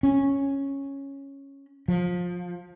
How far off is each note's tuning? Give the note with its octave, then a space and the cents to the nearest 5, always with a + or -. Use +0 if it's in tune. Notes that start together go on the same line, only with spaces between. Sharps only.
C#4 -5
F3 +25